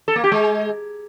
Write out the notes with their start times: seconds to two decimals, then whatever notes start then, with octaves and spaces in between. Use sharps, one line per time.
0.08 A4
0.16 A#3
0.24 G4
0.32 G#3